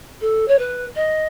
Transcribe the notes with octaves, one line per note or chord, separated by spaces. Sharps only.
A4
C#5
B4
D#5